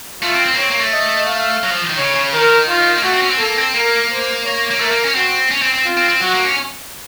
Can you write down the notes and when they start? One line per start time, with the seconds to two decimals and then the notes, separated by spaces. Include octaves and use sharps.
0.22 A3 F4
0.34 C4
0.46 C4
0.53 A#3
0.57 C4 C#5
0.70 A#3
0.81 A3
0.92 D#5
1.27 F5
1.64 F#3
1.71 F3
1.90 D#3
1.98 C#3 C#5
2.15 C#3
2.33 D#3 A#4
2.69 F4
2.96 A#3
3.03 A3 F#4
3.13 C4
3.22 C#4
3.30 C4
3.39 A#3 A4
3.57 C4
3.74 A#3 A#4
4.10 C5
4.44 C#5
4.71 A#3
4.80 A3 A#4
4.91 A#3
5.04 C#4
5.15 C4 F#4
5.51 C#4
5.62 C4
5.74 C4
5.85 F4
5.97 C4
6.09 C4
6.21 F#3 F#4
6.33 A#3
6.44 C#4